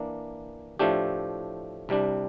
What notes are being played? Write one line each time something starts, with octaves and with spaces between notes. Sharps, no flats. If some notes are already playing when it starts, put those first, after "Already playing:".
Already playing: E3 A#3 D4
A2 F3 A3 D4 G4
C2 C3 G3 D4